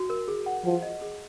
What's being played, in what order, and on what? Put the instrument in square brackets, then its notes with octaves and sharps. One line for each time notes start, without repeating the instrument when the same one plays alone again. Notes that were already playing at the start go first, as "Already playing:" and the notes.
Already playing: [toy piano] F#4
A#4
G#4
F#5
[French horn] F3 [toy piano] F#5
[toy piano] D#5
G#4